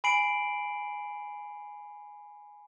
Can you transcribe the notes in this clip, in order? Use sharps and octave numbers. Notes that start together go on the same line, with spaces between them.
G#5 B5 C7 D7 F#7